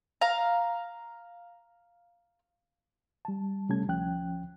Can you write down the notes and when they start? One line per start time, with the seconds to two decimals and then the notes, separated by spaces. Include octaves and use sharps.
0.21 F5 A#5
3.25 G3 A5
3.69 C3 G3 A3 C#4 A5 G#6
3.87 D2 F3 C#4 G5 F#6